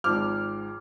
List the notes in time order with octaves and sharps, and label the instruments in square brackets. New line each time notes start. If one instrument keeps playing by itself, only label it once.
[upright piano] G#1 G#2 F3 D6 F6